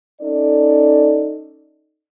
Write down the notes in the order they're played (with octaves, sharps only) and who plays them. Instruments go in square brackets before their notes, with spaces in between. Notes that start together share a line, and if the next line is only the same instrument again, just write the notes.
[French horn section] C#4 D#4 A4 D5